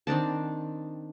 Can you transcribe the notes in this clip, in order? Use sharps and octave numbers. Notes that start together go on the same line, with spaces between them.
D#3 C4 D4 A5